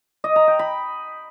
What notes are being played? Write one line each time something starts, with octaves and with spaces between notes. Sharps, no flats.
D#5
A#5
G5
B5